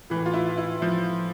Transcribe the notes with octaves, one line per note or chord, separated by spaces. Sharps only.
A2 E3
F4
E4
E4
F3